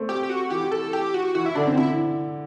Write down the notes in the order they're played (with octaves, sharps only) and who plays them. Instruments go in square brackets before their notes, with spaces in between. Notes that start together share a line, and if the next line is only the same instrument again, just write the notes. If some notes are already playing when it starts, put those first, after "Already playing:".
Already playing: [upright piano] A3 C4
[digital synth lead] G4
G4
F#4
[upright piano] E3 [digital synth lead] G4
[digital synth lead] A4
G4
F#4
[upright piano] E3 [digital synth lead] F#4
[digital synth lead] E4
[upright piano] D3 [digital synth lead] D4
[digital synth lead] C4
E4